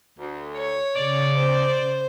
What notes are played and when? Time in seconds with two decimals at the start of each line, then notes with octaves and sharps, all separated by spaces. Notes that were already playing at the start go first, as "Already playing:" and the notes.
0.18 D2
0.57 C#5
0.96 C#3 D5
1.37 C5